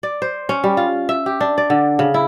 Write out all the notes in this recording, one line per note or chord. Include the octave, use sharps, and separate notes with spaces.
D5
C5
C#4
G3
F4
E5
G4
D4
D5
D3
C#3
E4